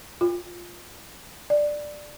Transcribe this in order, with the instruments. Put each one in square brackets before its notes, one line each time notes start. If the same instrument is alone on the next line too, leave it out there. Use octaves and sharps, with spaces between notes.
[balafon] F4
D5